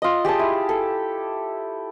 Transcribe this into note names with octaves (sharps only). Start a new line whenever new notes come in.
F4 D#5
G4 G#4 D#5 A5
E4
A4